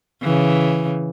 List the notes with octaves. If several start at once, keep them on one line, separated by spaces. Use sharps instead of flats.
C#3 E3